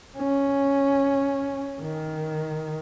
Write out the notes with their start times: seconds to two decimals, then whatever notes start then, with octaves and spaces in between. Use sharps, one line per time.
0.17 C#4
1.81 D#3